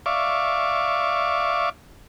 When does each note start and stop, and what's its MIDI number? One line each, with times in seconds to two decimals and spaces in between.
0.06 1.69 74
0.06 1.69 76
0.06 1.69 77
0.06 1.69 85
0.06 1.69 86